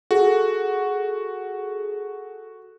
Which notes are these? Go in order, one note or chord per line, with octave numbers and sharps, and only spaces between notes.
F#4 G#4 A4